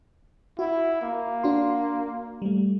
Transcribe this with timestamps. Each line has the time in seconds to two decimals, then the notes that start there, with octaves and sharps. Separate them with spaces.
0.59 E4 F#4
1.02 A#3
1.43 D4 F#4 C6
2.42 G3 A3